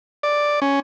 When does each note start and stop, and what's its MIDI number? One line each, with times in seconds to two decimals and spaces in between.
0.23 0.60 74
0.62 0.80 61